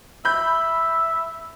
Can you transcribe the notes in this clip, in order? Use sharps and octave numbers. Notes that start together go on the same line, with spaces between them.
E5 B5 G6